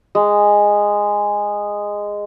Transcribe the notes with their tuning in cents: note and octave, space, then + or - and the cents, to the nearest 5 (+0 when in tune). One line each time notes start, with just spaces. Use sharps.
G#3 -10